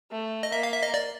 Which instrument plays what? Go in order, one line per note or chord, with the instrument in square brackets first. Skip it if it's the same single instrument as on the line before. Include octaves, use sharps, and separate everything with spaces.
[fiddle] A3
[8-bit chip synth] D#5
[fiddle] A#3 [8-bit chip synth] E5
[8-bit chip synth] F5
E5
D#5
D5